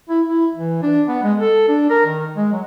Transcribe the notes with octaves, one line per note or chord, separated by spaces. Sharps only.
E4
E4
E3
D4
B3
G#3
A4
D4
A#4
D#3
G#3
F#3